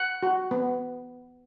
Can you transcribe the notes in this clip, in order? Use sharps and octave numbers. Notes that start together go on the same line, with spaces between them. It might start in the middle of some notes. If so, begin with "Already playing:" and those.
Already playing: F#5
F#4
B3